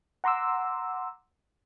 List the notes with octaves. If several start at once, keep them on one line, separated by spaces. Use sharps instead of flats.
F#5 A#5 C6 D6 E6